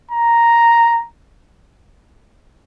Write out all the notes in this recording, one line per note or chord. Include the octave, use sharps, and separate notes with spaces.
A#5